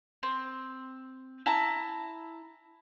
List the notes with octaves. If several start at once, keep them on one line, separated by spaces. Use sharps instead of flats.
C4
E4 A5 A#5